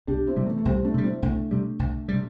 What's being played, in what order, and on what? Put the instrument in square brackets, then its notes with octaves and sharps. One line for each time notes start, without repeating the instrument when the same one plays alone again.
[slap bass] C2 [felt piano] D4 G4
[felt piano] C4 E4
[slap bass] C3 G3
[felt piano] E3 A3
A3
[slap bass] C2 [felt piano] G3 C4
[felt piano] A3 D4
[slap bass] C3 G3
[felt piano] C4 E4
[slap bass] C2 [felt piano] A3 D4
[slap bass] C3 G3
C2
C3 G3